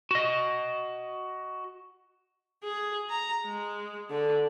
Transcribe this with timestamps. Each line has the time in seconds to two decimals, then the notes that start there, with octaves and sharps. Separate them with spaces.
0.11 F#4 D#5
2.63 G#4
3.10 A#5
3.45 G#3
4.10 D3